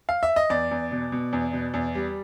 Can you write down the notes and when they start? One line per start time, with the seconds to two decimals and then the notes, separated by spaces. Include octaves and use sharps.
0.09 F5
0.23 E5
0.36 D#5
0.50 E2 D5
0.71 E2
0.92 B2
1.12 B2
1.33 E2
1.53 B2
1.74 E2
1.95 G3